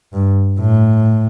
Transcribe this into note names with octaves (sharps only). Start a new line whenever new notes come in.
G2
A2